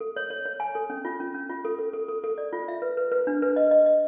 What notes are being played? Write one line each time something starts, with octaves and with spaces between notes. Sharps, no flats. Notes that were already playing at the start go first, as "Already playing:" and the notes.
A4
C#5
C#5
C#5
G#5
A4
C#4
F4
C#4
C#4
F4
A4
A4
A4
A4
A4
D5
F4
E5
B4
B4
B4
D4
B4
D#5
D#5
D#5